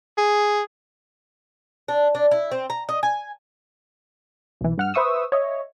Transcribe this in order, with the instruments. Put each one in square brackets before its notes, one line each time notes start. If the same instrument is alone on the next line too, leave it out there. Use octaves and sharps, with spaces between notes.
[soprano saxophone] G#4
[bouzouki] D4
D4
E4
C4
A#5
D#5
G#5
[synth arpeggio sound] B1 E3
G2 F#5 F6
B4 C5 E5 C#6 D#6 E6
C#5 D#5 E5